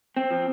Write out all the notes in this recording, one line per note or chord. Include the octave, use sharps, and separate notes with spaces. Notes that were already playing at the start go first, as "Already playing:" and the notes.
C4
F3